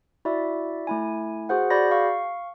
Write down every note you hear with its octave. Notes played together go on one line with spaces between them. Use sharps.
E4 F#4 D5 E5
A3 E4 G#5
F#4 G#4 C5 F#5
F#4 G#4 D5 B5 G6 A#6
F5 C#6